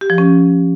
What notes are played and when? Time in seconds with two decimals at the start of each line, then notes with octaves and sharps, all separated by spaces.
0.01 G4
0.10 F3
0.18 C#4